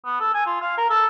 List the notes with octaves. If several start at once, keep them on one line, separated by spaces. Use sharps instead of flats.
B3
A4
G#5
F4
F5
A#4
A4